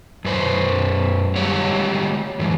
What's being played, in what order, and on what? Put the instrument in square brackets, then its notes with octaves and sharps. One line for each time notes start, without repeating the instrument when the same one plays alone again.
[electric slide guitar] F#2 B4 C5
G3 G#3 G4 C#5
F#2 E3